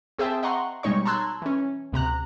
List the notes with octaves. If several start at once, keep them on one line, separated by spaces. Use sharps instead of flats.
C4 G#4 C5 E5 G5 A5
D#5 F#5 A#5 C6 C#6
B2 G3 G#3 D#4 C#5 C#6
A5 A#5 C6 E6 F#6 G#6
E3 C#4
D2 C3 A#5 F#6